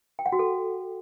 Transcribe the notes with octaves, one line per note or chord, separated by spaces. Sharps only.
G5
F#5
F#4
A4